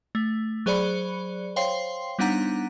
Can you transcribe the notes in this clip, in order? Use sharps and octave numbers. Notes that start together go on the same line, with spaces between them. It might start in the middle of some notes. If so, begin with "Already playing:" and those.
A3
F#3 G#4 C5 D5 B5 C#7
C5 C#5 F5 G5 C6 C7
G3 B3 D4 D#4 F#5 A#5